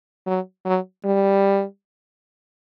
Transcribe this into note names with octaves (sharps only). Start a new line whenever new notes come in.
F#3
F#3
G3